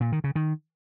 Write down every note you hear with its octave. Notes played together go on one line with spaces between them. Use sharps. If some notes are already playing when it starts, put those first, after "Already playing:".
A#2
D#3
C#3
D#3